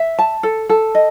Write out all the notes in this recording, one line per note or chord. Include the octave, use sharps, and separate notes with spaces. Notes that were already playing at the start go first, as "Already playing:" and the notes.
Already playing: E5
A5
A4
A4
D#5